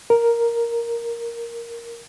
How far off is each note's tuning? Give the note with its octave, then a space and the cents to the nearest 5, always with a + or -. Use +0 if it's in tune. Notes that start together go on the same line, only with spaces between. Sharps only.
A#4 +5